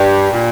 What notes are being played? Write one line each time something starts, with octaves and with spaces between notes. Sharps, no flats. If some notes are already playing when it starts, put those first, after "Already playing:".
Already playing: G2 G3 D4 G4
A#2